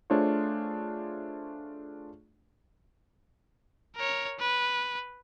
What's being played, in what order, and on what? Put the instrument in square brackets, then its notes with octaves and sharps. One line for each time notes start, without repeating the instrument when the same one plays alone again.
[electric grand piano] A3 D4 F4 G#4 C5 C#5
[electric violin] A#4 C#5
B4